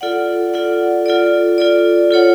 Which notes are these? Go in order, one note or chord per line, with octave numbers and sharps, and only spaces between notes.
F4 A4 D5 F#5
F4 A4 D5 F#5
F4 A4 D5
F4 A4 D5
F4 A4 C#5 F#5